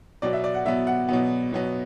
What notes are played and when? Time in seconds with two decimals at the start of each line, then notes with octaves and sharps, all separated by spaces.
0.22 B2 F#3 B3 D5
0.33 E5
0.44 D5
0.54 F#5
0.65 B2 F#3 B3 E5
0.87 F#5
1.09 B2 F#3 B3
1.52 B2 F#3 B3